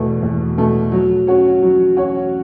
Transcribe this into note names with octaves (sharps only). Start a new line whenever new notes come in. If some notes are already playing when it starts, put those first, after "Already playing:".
Already playing: E2 B2 A3
E2
B2 A3
F#3
C#4 F#4 C#5
F#3
C#4 F#4 C#5